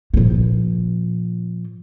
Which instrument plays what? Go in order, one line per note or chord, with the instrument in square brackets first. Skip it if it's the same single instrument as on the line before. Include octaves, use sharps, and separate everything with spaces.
[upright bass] A#2 F3